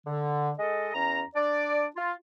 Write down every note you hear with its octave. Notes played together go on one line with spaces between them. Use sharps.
D3
G#3 A4 D#5
E2 C#4 A#5
D4 D5
F4